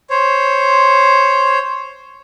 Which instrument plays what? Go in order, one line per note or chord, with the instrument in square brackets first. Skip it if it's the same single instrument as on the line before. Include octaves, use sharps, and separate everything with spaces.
[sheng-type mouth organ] C5 C#5